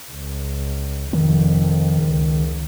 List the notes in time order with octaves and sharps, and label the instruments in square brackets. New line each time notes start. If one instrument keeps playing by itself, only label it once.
[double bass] C#2
[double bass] F1 F2 [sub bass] D#3
[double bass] C#2